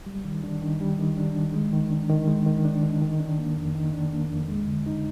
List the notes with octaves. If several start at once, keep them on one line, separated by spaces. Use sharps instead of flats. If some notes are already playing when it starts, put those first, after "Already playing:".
G3
D#3
D4
D#3
G3
D#3
D4
D#3
G#3
D#3
D4
D#3
G#3
D#3
D4
D#3
D#3
D4
A#3
F2
D#3
D4
A#3
F2
G#3
D3
D#4